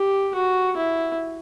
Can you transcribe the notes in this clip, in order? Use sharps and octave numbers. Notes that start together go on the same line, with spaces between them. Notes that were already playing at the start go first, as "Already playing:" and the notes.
Already playing: G4
F#4
E4